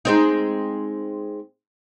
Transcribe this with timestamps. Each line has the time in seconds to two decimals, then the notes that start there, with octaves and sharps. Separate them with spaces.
0.05 G#3 C4 D#4